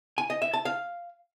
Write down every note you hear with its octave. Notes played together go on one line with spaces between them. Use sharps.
G#5
D#5
E5
A5
F5